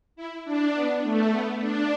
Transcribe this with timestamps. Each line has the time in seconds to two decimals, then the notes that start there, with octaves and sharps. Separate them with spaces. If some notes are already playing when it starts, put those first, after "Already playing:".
0.16 E4
0.45 D4
0.74 B3
1.03 A3
1.31 B3
1.61 D4